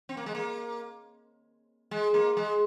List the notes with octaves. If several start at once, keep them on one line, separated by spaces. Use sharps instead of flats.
C4
A#3
G#3
A#3
G#3
A#3
G#3